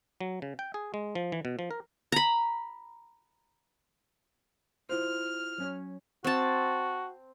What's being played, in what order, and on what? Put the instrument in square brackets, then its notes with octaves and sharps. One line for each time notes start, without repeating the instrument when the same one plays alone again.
[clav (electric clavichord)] F#3
C#3
G5
G#4
G#3
F3
E3
B2
F3
A#4
[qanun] A#5 B5
[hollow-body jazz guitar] E4 F4 C5 [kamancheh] F6
[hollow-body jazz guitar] F#3 C#4 C#5
[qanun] C4 A5 [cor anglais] F#4